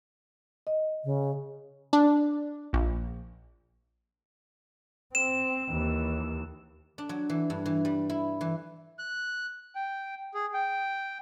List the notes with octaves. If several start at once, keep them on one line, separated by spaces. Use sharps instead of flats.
D#5
C#3
D4
A#1
C4 E7
D#2 E3
D4
F#3
E3
G2
E3
G3
E4
E3
F#6
G5
G#4
G5